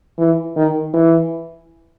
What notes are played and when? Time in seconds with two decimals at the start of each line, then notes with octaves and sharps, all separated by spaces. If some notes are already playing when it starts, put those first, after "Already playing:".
0.19 E3
0.56 D#3
0.94 E3